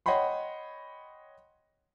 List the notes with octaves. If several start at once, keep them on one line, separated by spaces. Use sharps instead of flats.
C#5 D#5 F#5 G5 B5 C6